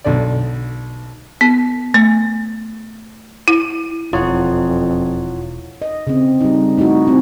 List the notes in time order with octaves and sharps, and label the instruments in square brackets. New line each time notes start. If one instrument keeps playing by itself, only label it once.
[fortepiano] B1 D3 D5
[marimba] B3
A3
E4
[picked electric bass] E1 [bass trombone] F2 [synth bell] E4 [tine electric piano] F4 C#5 F#5
[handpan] D#5
C#3 C4
G3 D#4
A3 D#4 E4 F#4
C4